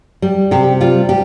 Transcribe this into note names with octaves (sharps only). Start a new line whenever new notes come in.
G3
C3 G4
G3 F4
G4